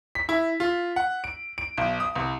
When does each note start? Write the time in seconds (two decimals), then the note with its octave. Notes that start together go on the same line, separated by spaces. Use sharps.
0.15 B6
0.29 E4
0.60 F4
0.96 F#5
1.24 D7
1.58 D7
1.78 B1
2.00 D#6
2.16 C2